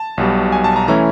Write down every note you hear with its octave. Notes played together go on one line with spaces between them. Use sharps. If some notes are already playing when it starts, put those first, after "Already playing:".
Already playing: A5
B1 B2 G3
G#5
A5
A#5
E3 A3 C#4 E4 A#5